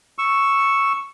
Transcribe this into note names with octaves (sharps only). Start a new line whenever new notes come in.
C#6 E6